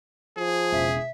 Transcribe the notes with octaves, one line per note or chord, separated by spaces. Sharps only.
F3 G#4
E1 C#3 E5